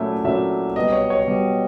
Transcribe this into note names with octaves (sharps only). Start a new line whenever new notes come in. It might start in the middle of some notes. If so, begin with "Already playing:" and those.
Already playing: A#2 F#3 A3 C#4 E4
A#2 F#3 A3 C#4 E4 E5
B2 G3 B3 D#5
C#5
C#5
B2 G3 B3